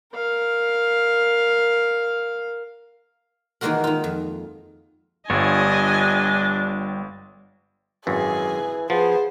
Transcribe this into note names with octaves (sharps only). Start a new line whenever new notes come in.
A#4 F5
D#3 E3 G#3 A#3 F#4 A#4
D#3 F4
F2
G1 G3 D4 F4 C#5 D#5 G#5
G#1 F#2 E3 G#4
F3 B3 G#4 C5